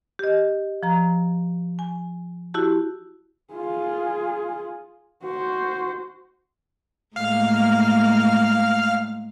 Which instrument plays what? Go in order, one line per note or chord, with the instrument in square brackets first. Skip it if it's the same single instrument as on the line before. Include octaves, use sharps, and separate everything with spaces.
[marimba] G4 D#5
F3 A#5
G#5
E4 F#4 G4 A5
[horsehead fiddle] F4 G#4
F#4 C5
[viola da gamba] A2 G#3 A#3 [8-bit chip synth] F5 F6